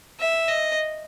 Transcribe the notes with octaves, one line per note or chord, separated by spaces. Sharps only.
E5
D#5